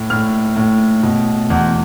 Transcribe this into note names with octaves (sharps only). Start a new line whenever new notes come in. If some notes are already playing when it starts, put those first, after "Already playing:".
Already playing: A2
A2 F6
A2
B2
E2